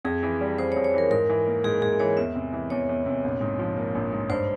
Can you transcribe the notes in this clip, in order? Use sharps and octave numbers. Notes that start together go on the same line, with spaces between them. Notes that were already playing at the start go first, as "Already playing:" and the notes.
F2 G#4
E3
G3
F2 C5
C#5
F2
C#5
E3 A#4
G#2 A#4
E3
A#3
G#2 G#4
G#2 G#4
E3 C#5
E2 E5
C3
E3
E2 C#5
E2
C3
A#1
G#2
F3
A#3
A#1
G#2
G2 C5